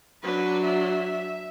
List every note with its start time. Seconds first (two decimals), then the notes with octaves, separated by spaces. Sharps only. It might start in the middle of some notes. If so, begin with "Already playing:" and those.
0.23 F#3 D4 B4
0.64 E5